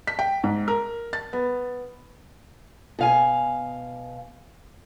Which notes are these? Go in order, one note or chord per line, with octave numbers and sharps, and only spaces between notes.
B6
G5
G#2
A#4
A6
B3
B2 F5 G#5